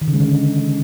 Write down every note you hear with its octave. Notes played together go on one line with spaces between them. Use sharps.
D#3
C#3
G#3
D3